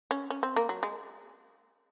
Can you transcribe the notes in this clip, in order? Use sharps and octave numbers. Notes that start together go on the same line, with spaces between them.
C#4
C#4
C4
A#3
F#3
G#3